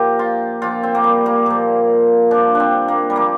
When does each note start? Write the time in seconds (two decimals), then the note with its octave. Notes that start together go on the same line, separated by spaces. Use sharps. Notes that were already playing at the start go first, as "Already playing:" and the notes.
Already playing: A#2 F3 G4 A#4
0.19 F4
0.62 A#2 F3 F4
0.83 C4
0.95 A#3
1.04 G3
1.26 A#3
1.46 A#2 F3
2.31 G2 F3 D4
2.55 C4 D4
2.88 A#3
3.10 G3
3.16 F3 A#3